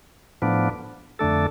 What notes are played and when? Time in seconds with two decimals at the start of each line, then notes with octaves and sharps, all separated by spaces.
0.42 A2 F3 B3 D4
1.19 F2 D3 A3 D4 A4